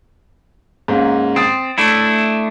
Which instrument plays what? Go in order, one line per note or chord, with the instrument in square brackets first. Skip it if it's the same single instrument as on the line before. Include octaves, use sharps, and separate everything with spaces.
[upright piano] G#2 A#3 C#4
[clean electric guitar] C4 [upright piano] D#6 A6
[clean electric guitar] A3 D4 E4